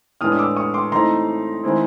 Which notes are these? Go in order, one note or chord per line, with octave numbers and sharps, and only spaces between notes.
A2 E3 G#3 B3 D4 D#6 F6
D#6
D6 E6
C#6 D#6
C6 D6
E3 A3 C4 D#4 A#5 C6
D#3 G#3 C4 E4